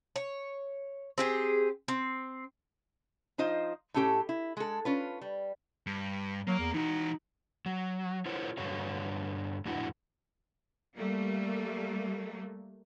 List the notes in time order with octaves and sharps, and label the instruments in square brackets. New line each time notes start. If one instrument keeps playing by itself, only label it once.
[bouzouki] C#5
C4 G4 G#4
C4
[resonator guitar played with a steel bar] F3 D#4 F4 C5 D#5
A2 A3 C#4 G4 A4
E4
G#3 A4
C#4 F4 B4
G3
[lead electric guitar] G2
[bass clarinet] F#3 [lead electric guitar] A#3 A#4
[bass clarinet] E2
[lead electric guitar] E3 F#4 [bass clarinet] D#4
[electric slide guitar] F#3
E4 F4 A#4 C5 C#5
G2 D3 F#4 C#5 F5
F2 A2 D4 E4 F#4
[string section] G3 A3 A#3